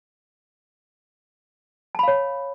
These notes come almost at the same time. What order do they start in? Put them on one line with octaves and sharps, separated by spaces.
A5 B5 F5 C#5